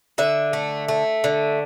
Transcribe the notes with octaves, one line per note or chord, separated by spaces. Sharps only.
D3 E5
A3
A3
D3